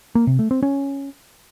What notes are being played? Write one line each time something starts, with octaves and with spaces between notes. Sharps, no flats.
A#3
C3
A3
C4
C#4